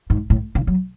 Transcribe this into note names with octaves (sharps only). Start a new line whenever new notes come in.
G#2
A2
C#3
F#3